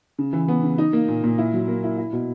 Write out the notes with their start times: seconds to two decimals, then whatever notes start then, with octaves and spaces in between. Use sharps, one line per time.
0.19 C#3
0.33 E3
0.48 B3
0.63 C#3
0.78 D#4
0.93 A#3
1.09 A#2
1.24 A#2
1.38 E4
1.54 F#3
1.68 A#3
1.84 E4
1.98 E4
2.13 B2